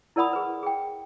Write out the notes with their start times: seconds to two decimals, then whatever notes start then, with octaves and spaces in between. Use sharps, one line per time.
0.16 E4 A#4 D5 F#5 B5 D#6
0.33 G#4 B4
0.63 G#4 G5